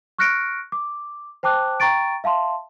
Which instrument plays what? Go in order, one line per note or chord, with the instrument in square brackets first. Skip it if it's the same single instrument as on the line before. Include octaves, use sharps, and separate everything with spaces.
[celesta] C#6 F6 F#6 A#6 C#7 D7
D6
C5 G5 A5 D6 F#6
G5 A#5 C#6 A6 D7
E5 F5 A5 C6